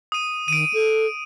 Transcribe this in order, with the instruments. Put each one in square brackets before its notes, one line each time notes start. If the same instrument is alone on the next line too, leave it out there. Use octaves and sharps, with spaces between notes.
[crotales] D#6 D#7
[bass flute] D#3 [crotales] D7 D#7
[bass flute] A4